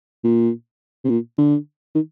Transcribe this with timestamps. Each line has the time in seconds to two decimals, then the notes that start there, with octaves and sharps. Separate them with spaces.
0.24 A#2
1.05 C3
1.10 A#2
1.38 D3
1.95 D#3